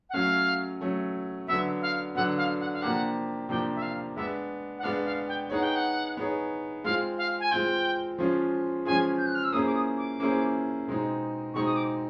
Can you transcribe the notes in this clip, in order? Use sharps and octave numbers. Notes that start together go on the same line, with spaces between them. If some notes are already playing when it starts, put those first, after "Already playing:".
F#5
F#3 A3 C#4 F5
F#3 A3 C#4
D3 F#3 B3 E5
F5
D3 F#3 B3 F#5
F5
F#5
F5
C3 F3 A#3 D4 G4 F#5
C3 F3 A#3 D4 G4 G5
E5
F5
G#3 B3 D4 E5
F#5
G#3 B3 D4 F5
F5
G5
B3 D#4 G#4 C#5 F#5
G5
F#5
B3 D#4 G#4 C#5
G#3 C4 F4 F5
F5
G#5
G#3 C4 F4 G5
F3 G#3 C#4 F4 G#4
F3 G#3 C#4 F4 G#4 G#5
G6
F#6
F6
E6
A#3 C#4 E4 G#4 C5 D#6
D6
D#6
D6
A#3 C#4 E4 G#4 C5
B2 G#3 C4 D#4
B2 G#3 C4 D#4 C#6
D#6
D6